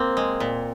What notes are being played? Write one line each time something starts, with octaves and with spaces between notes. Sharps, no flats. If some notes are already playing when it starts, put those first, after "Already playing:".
Already playing: A#3 C4
G#3
A#2